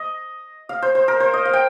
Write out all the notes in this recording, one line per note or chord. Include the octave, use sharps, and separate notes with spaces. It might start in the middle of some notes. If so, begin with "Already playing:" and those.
Already playing: D#5
F5
C5
C5
A#4
C5
D#5
F5
G5